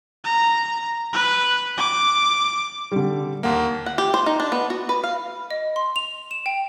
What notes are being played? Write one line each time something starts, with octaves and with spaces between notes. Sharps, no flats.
A#5
B4
D6
D3 G3
D#2 A#3 F5 F#5 C6
F#5
G4
C5
D#4
D4
B3
F#4
B4
F5
D#5
C6
F7
E7
G5